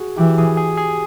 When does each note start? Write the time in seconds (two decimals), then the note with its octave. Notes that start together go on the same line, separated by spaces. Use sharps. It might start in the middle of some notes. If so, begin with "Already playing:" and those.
Already playing: F#4 G#4
0.18 E3 G4
0.38 G#4
0.57 G#4
0.78 G#4